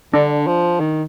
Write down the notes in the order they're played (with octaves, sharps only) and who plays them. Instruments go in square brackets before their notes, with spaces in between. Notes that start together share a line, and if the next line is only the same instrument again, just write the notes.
[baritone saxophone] D3 [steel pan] D4
[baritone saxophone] F3
D#3